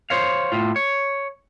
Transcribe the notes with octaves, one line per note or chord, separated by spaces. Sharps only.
C5 C#5 F5
A2 F4
C#5